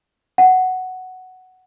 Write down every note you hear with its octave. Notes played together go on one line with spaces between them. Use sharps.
F#5